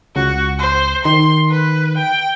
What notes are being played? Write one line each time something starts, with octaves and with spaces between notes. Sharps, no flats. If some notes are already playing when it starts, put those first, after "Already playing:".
C#2 F#4
C5
D#3 C6
B4
G5